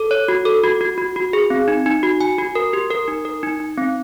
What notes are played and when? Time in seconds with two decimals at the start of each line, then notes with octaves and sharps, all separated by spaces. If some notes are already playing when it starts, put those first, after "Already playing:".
Already playing: A4
0.11 C#5
0.28 F#4
0.45 A4
0.64 F#4
0.81 F#4
0.98 F#4
1.16 F#4
1.33 G#4
1.50 C4
1.68 D#4
1.86 D#4
2.03 F#4
2.21 G#5
2.38 F#4
2.55 A#4
2.73 G4
2.91 A#4
3.08 D#4
3.25 A#4
3.43 D#4
3.60 D#4
3.78 C4